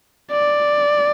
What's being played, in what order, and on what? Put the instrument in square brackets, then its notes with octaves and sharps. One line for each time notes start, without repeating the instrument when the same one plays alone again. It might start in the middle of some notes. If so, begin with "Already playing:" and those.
[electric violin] D5